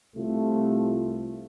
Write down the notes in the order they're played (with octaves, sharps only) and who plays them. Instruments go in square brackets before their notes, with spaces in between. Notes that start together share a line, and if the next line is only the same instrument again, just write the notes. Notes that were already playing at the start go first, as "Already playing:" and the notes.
[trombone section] C2 C3 A3 F4